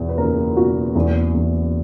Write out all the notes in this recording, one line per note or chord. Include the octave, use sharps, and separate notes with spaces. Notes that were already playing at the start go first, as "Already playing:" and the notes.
Already playing: E2 B2
B4
F#1 A#4
B2 F#4
E2
E2